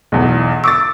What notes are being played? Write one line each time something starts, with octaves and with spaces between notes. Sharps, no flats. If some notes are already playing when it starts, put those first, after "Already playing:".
B1 E2
C#6 D6 E6 A6